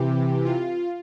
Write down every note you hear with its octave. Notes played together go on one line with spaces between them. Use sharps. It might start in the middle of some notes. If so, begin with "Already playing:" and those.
Already playing: C3 E3 G4
F4